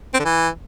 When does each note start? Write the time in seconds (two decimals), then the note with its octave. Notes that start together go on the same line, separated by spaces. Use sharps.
0.14 C4
0.19 D3
0.25 E3